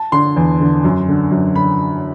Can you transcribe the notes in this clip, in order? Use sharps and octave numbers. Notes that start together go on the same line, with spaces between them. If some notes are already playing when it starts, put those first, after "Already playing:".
Already playing: A5
D3 C6
E2
D3
F#2
D3
F#2
D3 B5